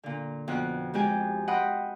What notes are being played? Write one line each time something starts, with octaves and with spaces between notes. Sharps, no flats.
A#2 D3
F2 B2 F#6
F2 G#3 C4 G4 G#5 G6
D#5 F#5 G5 B5 C6 D#6